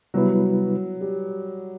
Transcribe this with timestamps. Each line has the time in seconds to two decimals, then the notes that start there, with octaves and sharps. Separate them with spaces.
0.14 C3 F#3 G3 B3 E4 B4
1.01 G3